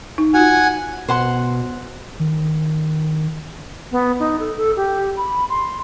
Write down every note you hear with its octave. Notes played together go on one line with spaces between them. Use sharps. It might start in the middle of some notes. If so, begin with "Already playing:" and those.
D#4
F4 F#4 F#5 G#5
B2 C5 F#5 C6
D#3
B3
D#4
A4
A4
G4
B5
C6